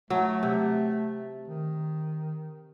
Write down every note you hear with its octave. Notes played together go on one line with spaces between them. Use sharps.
F#3 A3
C3
D#3